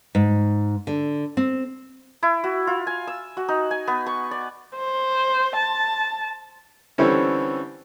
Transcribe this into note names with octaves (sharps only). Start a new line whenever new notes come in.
G#2
D3
C4
E4
F#4
F4
G#5
E6
F#4
D#4
G#5
B3
C#6
D5
C5
A5
D3 E3 G3 C4 C#4